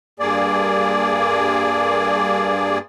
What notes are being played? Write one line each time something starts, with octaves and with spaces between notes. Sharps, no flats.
G2 A#3 G#4 D5